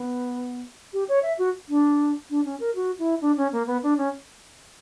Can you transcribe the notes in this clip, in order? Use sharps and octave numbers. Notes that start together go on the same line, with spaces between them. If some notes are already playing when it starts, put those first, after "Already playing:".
Already playing: B3
G4
C#5
E5
F#4
D4
D4
C#4
A#4
F#4
E4
D4
C#4
A#3
B3
D4
C#4